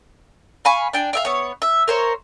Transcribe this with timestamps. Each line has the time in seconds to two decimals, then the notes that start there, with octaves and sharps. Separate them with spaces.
0.65 F5 G#5 B5 C#6
0.93 D4 G5 G#5
1.13 D5 E5 F5
1.25 B3 C#5
1.62 E5
1.88 A#4 C5 C#5